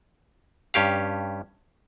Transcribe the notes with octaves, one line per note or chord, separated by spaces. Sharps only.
G2 C#4 G4 F5